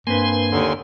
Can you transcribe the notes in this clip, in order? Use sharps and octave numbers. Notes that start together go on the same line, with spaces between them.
G2 A#3 C4 B4 G#5 C6
D#2 D3